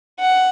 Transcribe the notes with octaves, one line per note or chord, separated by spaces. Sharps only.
F#5